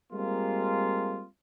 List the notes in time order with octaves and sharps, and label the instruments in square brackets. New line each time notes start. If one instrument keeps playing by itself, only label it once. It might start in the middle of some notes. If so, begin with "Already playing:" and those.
[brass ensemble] G3 G#3 A#3 C4 F4